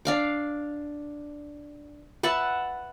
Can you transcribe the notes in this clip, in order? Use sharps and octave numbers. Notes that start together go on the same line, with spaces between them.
D4 F5 D6
B4 E5 F#5 A5